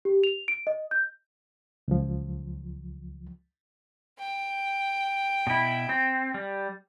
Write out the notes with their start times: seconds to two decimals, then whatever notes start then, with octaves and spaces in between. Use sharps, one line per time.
0.05 G4
0.24 F7
0.48 D7
0.67 D#5
0.91 G6
1.88 C#2 F3
4.19 G5
5.47 B2 E4
5.89 C4
6.34 G3